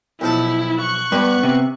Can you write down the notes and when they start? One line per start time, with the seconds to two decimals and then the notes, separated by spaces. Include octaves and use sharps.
0.21 B1 F3 E4 A4
0.80 C#6 F#6
1.12 G2 B3 B4
1.43 C3